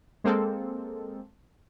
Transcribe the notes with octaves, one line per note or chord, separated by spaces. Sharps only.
G#3 A#3 C4 A4